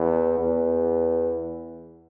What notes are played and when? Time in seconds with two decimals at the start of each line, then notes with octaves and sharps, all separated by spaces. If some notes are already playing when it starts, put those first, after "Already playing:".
Already playing: E2
0.38 E2